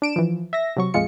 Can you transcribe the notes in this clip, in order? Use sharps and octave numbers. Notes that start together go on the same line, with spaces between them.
D4 D7 E7
E3 F3
E5 A#6
C3 F#3 C#6
A#1 F2 G#3 F4 C#7